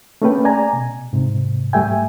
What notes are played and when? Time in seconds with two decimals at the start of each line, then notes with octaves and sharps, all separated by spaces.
0.22 A3 A#3 C#4 G#4 B4 G5
0.45 D5 G#5 A#5
0.73 B2
1.13 G#2 C3
1.73 G#2 G3 A3 E5 G5 G#5